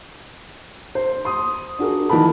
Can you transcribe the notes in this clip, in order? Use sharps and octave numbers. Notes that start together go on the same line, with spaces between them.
C5
C6 D#6
D4 F#4 G#4 A#4
D#3 E3 A#4 A5 B5